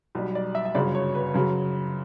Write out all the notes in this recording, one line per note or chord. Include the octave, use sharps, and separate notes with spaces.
B1 B2 G3
D5
E5
E5
G1 F#2 C#3 F#3 D5
C#5
B4
F#2 C#3 F#3